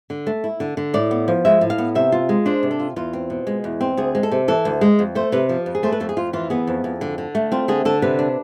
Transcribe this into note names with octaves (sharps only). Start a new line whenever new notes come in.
D3
A3
E4
D3
D3
A2 D5
B3
F3
G#3 E5
A2
F5
B3
C3 E5
F4
G#3
D4 C5
C3
A4
F4
E2 F4
C4
B2
G#3
E2
C4
D2 G#4
G#3
A4
C3
E3 A4
D2
G#3
F2
A3 C5
C3 B4
F3
F2
G#4
A3 C5
B4
F2 A4
G#4
F2 F4
E3 F4
B3 G#4
F2
F2
D3
D3
A3
C4 F4
D3 G#4
D3 A4
C3 B4
D4